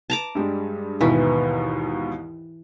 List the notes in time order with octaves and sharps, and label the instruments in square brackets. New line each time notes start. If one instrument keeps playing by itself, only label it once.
[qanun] A5 A#5 D6
[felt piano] G2 G3 G#3
[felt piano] D#2 G#2 B2 [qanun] E3